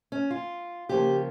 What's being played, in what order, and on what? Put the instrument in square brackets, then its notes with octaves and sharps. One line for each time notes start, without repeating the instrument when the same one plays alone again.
[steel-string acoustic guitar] C#4
F4
C#3 F3 A#3 G4